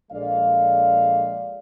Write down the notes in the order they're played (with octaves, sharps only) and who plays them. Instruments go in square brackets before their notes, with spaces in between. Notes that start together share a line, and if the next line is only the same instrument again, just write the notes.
[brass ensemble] A#1 G#3 A4 D5 F5